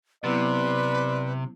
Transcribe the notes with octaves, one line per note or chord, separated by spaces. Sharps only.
C3 F#3 B3 E4 B4 D5